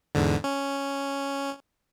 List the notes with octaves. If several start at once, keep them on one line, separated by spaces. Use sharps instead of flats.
E2 G#2 D3
C#4